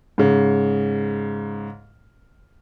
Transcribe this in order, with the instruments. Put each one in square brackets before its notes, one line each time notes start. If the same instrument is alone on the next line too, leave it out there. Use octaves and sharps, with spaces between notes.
[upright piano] G#2 C#3